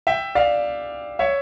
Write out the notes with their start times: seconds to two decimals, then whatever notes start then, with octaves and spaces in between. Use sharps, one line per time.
0.07 E5 G5
0.35 D5 F5
1.19 C#5 E5